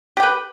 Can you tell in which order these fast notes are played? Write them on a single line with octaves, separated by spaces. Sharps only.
G4 G5 B4